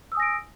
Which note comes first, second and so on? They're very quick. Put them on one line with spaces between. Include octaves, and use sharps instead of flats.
E6 D#6 G#5 A#6 D7